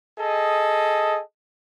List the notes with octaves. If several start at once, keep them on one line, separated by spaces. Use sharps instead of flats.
G#4 A4 D#5